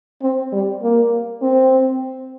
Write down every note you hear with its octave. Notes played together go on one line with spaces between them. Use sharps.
C4
G3
A#3
C4